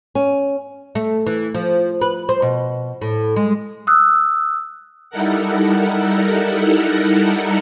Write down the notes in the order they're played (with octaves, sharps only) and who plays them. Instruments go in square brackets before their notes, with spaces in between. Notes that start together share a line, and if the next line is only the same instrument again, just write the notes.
[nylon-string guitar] C#4
[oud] A3
E3
F3
B4
C5
B2
A2
G#3
[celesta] D#6 E6 F#6
[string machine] G3 D#4 E4 A4 A#4 F#5